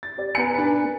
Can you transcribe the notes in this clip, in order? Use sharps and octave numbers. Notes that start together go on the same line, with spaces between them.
A6
G4 D5
B3 G#5 A#5 C#7
D4 B4
A#3